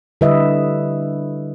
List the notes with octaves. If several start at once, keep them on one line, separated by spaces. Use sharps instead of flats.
D3 G3 E4 B4 D#5 E5